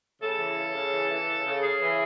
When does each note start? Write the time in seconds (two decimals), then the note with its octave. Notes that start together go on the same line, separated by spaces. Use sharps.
0.21 C#3 A4
0.39 E3
0.57 C#3
0.74 C#3
0.92 E3
1.11 E3
1.28 C#3
1.46 C#3
1.64 C#3 G#4
1.81 E3